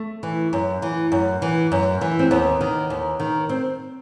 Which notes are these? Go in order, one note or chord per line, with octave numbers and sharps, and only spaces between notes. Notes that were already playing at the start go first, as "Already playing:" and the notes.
Already playing: A3
E3
F#2
E3
F#2
E3
F#2
E3
C4
D#2 B3
D#3
D#2
D#3
C4